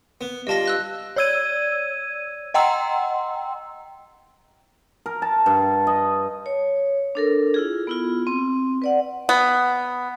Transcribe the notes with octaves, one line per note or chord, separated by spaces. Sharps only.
B3
G2 F4 D#5 A5 A#6
E6 F#6 A#6
C#5 D5 E6 G#6 D#7
D#5 F#5 G5 A#5 C6 E6
A#4
A5
G2
D#5
C#5
D4 A4 A#4
E4 F4 G#4
B3 E4 F4
C4
B4 D5 F#5
B3